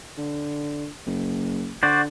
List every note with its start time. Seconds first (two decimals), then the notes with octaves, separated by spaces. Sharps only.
0.18 D3
1.07 F#1
1.83 D3 F#4 C5 D5